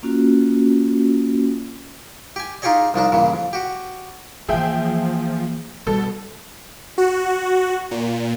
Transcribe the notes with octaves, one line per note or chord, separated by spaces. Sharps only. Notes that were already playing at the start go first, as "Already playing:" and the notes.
A#3 C#4 F4 F#4
G4 G#5
D#4 F4 G4 G#4 C#5 D#5
C2 F3 D4 D#4
G2 A#2 C#3 E3
F2
F#4 G4
E3 F3 A#3 G#4 E5 G5
B2 G3 A4
F#4
A#2